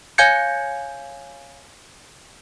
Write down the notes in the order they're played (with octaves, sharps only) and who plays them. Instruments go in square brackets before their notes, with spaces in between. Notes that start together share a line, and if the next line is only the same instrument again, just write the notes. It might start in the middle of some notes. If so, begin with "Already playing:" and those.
[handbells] C#5 F5 G#5 G6 G#6 C#7